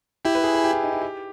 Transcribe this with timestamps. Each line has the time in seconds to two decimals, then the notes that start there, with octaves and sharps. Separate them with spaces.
0.25 E4 G4
0.35 B4
0.44 G#4
0.54 G#4
0.64 G4
0.73 E4
0.83 D#4
0.92 E4
1.02 G4